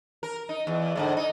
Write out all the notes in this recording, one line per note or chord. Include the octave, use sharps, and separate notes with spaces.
A#4
D#4
E2
E2 G#2 D3
D#4